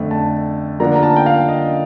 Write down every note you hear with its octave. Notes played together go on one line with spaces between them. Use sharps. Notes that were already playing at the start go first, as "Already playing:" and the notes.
Already playing: F2 D3 A3 D4
A5
D3 F3 A#3 D4 A#5
A#5
A5
G5
F5
D#5